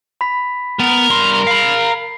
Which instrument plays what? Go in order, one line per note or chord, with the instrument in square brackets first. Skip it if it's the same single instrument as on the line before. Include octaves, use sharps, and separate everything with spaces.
[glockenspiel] B5 B6
[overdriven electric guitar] B3 [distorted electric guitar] A#4
[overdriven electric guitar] G2 C6
[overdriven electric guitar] F5 B5 [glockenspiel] C7